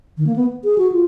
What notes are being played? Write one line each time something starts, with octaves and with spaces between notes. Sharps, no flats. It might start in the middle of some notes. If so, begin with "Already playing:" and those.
D#3
A#3
B3
G#4
F#4
F4